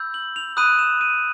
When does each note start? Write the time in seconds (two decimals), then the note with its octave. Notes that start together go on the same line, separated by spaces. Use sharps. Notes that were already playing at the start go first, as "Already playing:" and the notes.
Already playing: B5 E6 G6
0.14 F#7
0.36 F7
0.57 B5 D#6 F#6 D#7
0.79 E7
1.01 D#7